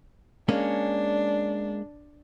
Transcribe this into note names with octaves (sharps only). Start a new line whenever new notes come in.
G#3 A#3 C#4 D4